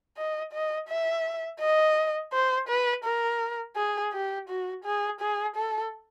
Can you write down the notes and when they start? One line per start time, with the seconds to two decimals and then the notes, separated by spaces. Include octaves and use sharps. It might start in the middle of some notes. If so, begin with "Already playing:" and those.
0.17 D#5
0.53 D#5
0.89 E5
1.60 D#5
2.32 C5
2.68 B4
3.04 A#4
3.76 G#4
4.13 G4
4.48 F#4
4.84 G#4
5.21 G#4
5.56 A4